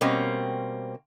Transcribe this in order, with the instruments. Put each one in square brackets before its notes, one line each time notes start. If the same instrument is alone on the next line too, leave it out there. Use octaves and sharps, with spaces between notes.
[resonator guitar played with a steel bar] B2 G3 A#3 C4 C#4